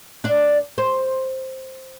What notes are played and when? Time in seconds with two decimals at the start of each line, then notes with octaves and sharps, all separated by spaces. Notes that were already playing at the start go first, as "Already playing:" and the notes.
0.24 D4 D5
0.78 C5